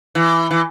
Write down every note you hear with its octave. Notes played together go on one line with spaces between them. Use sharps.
E3
E3